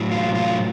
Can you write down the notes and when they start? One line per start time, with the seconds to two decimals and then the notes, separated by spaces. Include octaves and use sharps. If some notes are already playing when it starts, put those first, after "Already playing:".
Already playing: A2 F#3
0.11 F4
0.35 F4